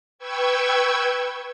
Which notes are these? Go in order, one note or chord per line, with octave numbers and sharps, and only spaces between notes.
B4 G5 C#6 E6 G#6